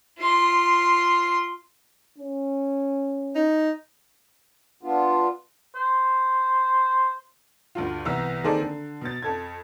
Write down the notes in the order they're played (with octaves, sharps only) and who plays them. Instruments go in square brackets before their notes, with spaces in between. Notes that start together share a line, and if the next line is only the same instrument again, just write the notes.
[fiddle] F4 C6
[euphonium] C#4
[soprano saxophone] D#4
[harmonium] B3 D4 F4
[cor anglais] C5
[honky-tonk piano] D2 G2 F4
C2 E3 B3 A#5 E6
D#3 A#3 C4 G#4 A4 D5
D3
B2 A6
F2 A4 G#6